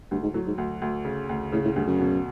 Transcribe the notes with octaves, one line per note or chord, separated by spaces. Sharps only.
D2 G2
G#2
A2 F#3
G#2
D2
D2
C#3
D2
A2 C#3
A2
D2 G2
F#2
B2